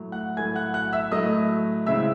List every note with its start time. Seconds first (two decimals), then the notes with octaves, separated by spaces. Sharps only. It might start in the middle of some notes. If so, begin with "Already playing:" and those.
Already playing: A2 F#3 A3
0.12 F#5 F#6
0.36 A2 F#3 A3 G#5 G#6
0.55 F#5 F#6
0.74 F#5 F#6
0.93 E5 E6
1.12 A2 F#3 A3 D#5 D#6
1.86 C#3 G#3 C4 E4 E5 E6